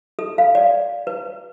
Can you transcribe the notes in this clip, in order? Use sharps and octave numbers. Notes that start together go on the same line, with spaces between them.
A4
F5
D5
B4